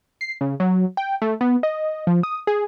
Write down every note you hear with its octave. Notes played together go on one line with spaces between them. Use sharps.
C7
C#3
F#3
G5
A3
B3
D#5
F3
D#6
G#4